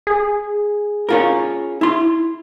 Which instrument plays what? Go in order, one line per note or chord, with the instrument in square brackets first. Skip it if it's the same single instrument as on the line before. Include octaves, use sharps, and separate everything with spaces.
[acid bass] G#4
[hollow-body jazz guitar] C#4 F4 A#4
E4 C6